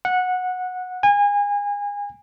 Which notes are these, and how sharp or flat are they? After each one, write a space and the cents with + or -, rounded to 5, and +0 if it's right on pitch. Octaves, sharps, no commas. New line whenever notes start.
F#5 -15
G#5 -30